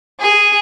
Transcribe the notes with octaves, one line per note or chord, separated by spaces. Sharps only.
G#4